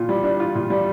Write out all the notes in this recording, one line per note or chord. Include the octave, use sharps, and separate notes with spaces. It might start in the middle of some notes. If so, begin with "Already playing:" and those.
Already playing: A#2 F4
G3
D4
F4
A#2
G3